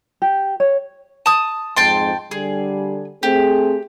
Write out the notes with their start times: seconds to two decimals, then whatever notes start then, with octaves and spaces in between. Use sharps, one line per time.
0.22 G4
0.60 C#5
1.26 A5 D#6
1.76 F2 G#2 G5 A5 C6
2.31 D3 G3 G#4
3.23 A3 C4 G4 G#4